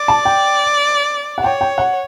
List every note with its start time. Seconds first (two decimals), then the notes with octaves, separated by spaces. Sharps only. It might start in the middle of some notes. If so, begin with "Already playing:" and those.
Already playing: D5
0.08 A5
0.25 G5
1.38 F#5
1.43 C#5 G5
1.61 G5
1.78 F#5